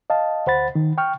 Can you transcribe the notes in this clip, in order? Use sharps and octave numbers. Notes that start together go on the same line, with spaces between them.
D#5 F5 A5
D2 C5 F#5 B5 A6
D#3
G5 C#6 F6